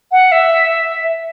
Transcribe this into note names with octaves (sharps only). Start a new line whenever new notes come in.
F#5
E5